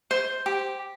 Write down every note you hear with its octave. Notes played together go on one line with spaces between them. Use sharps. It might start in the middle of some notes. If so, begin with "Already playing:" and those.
C5
G4